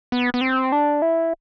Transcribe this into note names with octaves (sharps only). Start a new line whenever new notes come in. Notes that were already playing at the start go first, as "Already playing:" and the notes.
B3
B3
C4
D4
E4